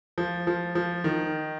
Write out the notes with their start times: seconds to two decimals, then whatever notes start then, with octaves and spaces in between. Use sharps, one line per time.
0.18 F3
0.47 F3
0.75 F3
1.04 D#3